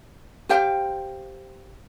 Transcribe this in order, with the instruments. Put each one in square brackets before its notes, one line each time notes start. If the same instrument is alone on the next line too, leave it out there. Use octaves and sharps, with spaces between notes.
[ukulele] G4 C5 F5 G5